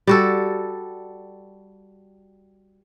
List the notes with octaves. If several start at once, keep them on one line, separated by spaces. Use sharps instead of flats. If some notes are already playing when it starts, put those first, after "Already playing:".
G3 F#4 A4